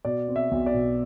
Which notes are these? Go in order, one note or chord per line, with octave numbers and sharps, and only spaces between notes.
B2 D5
C4
E5
B1
D5
B2